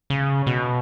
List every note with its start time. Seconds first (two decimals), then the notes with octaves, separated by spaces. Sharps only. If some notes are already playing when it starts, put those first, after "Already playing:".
0.10 C#3
0.47 B2